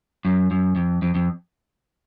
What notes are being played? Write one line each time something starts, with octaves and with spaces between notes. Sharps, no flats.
F#2
F#2
F2
F2
F2